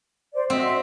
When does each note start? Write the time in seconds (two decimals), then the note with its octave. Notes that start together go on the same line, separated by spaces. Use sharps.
0.34 C5 D5
0.50 C4 F#4 D#5 E5